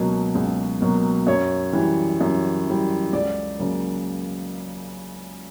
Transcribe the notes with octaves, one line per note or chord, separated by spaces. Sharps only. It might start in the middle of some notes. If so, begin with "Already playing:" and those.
Already playing: C#2 B2 F#3 A#3
C#2
B2 F#3 A#3
F#2 C#5
E3 G3
F#2
E3 G3
C#2 D5
C#3 F#3 A#3